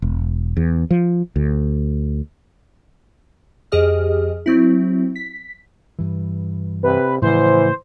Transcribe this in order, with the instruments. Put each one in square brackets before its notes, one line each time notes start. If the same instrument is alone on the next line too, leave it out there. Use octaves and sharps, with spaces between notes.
[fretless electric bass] E1
E2
F3
D2
[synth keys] F2 G4 G#4 D#5 F6
F#3 C4 E4
B6
[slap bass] G2 E3
[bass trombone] C3 [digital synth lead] B4
[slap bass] A2 C#3 F3 [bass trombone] E3 [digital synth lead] C5